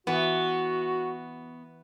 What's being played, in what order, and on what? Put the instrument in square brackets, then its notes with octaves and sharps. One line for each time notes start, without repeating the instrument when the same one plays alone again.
[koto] E3 [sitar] B3 [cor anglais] F#4